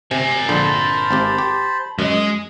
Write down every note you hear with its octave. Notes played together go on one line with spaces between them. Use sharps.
C3 A#4 G#5
A#1 D3 C5 A5 B5
G#1 C4 G4
G4
F#2 G#3 D#5